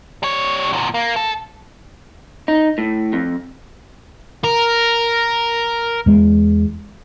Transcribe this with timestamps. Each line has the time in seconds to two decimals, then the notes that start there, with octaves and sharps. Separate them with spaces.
0.23 G3 C#5
0.73 E2 A#2
0.94 A#3
1.16 A4
2.48 D#4
2.78 A2
3.13 F2
4.44 A#4
6.06 E2 G#3